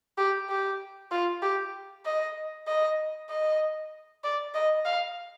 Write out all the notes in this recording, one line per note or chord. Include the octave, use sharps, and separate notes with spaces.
G4
G4
F4
G4
D#5
D#5
D#5
D5
D#5
F5